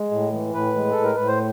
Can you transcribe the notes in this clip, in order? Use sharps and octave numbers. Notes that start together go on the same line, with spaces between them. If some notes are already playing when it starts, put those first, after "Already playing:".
Already playing: G#3
A2
E3
A2 B4
G#3
A2 A4
A#4
A2 B4
C5